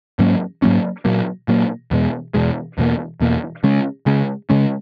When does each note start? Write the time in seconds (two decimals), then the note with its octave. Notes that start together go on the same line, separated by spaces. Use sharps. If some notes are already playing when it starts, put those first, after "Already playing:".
0.19 G#2 F#3 A#3 C#4
0.62 G#2 F#3 A#3 C#4
1.05 A#2 F#3 A#3
1.48 A#2 F#3 A#3
1.91 E2 B2 G#3
2.34 E2 B2 G#3
2.78 E2 B2 A#3
3.20 E2 B2 A#3
3.64 C#3 G#3 C#4
4.06 C#3 G#3 C#4
4.50 C#3 G#3 C#4